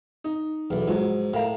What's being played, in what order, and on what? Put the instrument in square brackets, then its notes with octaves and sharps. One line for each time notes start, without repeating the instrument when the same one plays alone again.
[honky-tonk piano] D#4
[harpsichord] B1 E2
[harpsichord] G#2 [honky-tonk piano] F3 F#3
[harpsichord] A2 [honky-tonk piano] A#4 F5